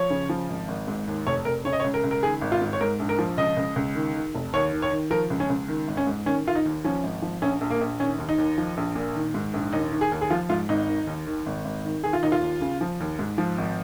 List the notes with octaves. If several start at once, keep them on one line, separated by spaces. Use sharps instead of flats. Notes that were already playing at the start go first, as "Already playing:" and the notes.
Already playing: F3 C#5
C#3
F3
G#1
G#1
G#2
D#2
F1 C#5
F1 A#4
C#3 C#5
D#5
C#5
C#2
A#4
C#2
A#4
D#3 G#4
G#1
F4
G#2
C#5
G#2 A#4
A#1
A#4
F3
C#2 D#5
C#2
C#2
D#3
D#3
F1
D#2 C#5
D#3
C#5
D#3
F3 A#4
C#2
C#4
C#2
D#3
G#1
C#4
G#2
D#3 C#4
D#3 F4
D#4
D#2
F3 C#4
G#1
F3
A#1 C#4
A#1
A#3
A#1
D#3 C#4
D#2
D#4
D#2
F3
A#1
A#2
D#3
G#2
A#1
D#2 D#4
D#3
G#4
D#2
G#4
F3 F4
G#2 F4
G#1 D#4
D#3
D#2
D#3
G#1
G#1
D#3
D#3 G#4
F4
D#2 D#4
F4
D#2
C#3
F3
D#2
G#2
F3
G#1